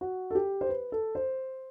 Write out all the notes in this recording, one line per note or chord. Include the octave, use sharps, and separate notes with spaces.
F#4
A4
G4
C5
B4
A4
C5